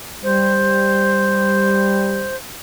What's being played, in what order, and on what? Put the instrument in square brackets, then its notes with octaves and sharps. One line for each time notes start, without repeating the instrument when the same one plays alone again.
[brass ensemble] G3 [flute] C5